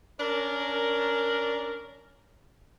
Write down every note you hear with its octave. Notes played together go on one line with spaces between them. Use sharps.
C#4 D4 A#4